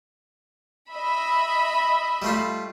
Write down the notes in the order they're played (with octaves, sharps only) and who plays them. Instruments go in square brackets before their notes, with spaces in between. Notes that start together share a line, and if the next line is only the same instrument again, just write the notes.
[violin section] D#5 E5 B5
[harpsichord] G3 A3 F4